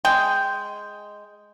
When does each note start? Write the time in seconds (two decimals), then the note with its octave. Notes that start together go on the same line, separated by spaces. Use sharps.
0.05 G#3 G5